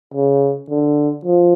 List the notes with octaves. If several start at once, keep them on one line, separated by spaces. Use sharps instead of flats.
C#3
D3
F3